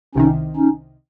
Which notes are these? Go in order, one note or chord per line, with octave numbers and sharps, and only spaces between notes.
C2 C3 D#3 C#4 D#4
C#4 D#4